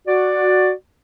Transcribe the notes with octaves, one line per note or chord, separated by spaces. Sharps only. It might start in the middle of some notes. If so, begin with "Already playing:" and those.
F#4 D5